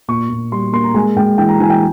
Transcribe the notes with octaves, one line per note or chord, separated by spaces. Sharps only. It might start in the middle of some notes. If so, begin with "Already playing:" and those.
A#2 C#6
A#2
G3 C6
A#3 C6
A#5
G#3 G#5
G#3 G5
E3 G5
A#5
E3 G#5
G5